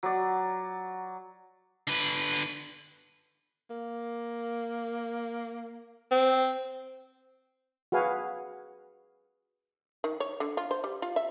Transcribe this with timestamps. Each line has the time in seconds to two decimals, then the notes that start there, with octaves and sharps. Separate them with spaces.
0.03 F#3 D5
1.87 D3 B4
3.70 A#3
6.11 C4
7.92 F#4 G#4 B4 F5 G#5
10.04 D#3
10.20 C#5
10.40 D3
10.57 F4
10.71 C5
10.84 G3
11.02 F4
11.16 E5